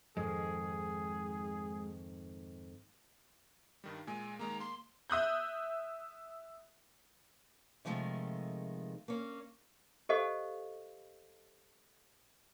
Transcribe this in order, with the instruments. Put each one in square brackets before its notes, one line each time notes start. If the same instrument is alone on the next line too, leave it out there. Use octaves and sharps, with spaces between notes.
[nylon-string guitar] F2 G#2 D#3 [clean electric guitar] G#3 [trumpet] G#4
[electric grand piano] G2 D#3 G3
[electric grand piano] A#2 G#3 [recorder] G#5
[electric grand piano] D#3 G#3 A#3 [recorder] A#5
[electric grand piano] A#3 [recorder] C6
[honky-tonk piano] E5 D#6 F#6 G6
[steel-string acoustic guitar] C3 D#3 F3 G#3 A3
A#3 C#4
[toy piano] G4 A4 C5 D#5 F5